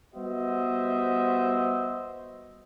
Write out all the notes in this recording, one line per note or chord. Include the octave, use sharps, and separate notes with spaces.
G3 B3 F#4 C5 D#5 E5